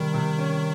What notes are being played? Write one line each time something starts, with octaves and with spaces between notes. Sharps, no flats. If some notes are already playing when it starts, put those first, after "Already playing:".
Already playing: C3 D#3 G3
C3
C#4